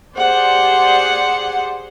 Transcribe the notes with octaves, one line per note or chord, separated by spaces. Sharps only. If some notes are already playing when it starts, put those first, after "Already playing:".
G4 G#4 C5 D5 F#5